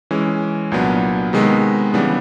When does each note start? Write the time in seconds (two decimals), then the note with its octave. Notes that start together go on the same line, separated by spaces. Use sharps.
0.11 E3 G#3 C#4
0.71 C2 A#2 F#3 B3 D4
1.33 C3 D#3 G#3 B3
1.94 C#3 E3 G3 B3 D4